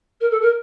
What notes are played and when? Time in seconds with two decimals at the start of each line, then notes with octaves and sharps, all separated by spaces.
0.20 A#4
0.31 A4
0.41 A#4